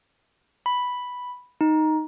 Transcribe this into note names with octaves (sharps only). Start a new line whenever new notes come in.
B5
D#4